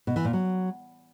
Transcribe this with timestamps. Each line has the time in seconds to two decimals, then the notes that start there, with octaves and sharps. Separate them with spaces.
0.07 B2
0.16 E3
0.25 A#2
0.33 F#3